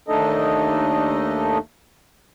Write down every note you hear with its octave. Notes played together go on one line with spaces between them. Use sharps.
D#2 A3 D4 D#4 A4 D#5